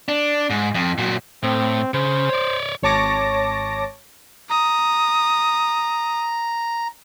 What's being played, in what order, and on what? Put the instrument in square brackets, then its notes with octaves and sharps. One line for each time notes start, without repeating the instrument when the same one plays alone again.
[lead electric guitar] D4
G#2
F2
A#2 F#3
[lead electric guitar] A2 [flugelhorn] C4
[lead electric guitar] C#3 [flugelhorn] C5
[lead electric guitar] C#5 D5
[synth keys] G#1 C#5 A5 D6 A#6
[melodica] A#5 [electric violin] D#6